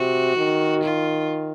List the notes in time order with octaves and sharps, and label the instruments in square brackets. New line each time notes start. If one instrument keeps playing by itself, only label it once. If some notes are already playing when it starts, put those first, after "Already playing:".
Already playing: [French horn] C3 [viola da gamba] F#4
[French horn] D#3
[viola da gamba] F4